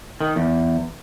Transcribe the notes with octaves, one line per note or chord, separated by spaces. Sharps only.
D#3
E2